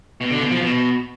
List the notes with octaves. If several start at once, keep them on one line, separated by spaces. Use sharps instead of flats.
B2
D3
B2
F3
B2